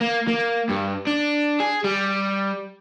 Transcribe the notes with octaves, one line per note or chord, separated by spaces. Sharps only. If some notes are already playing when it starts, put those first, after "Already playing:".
A#3
A#3
G2
D4
G#4
G3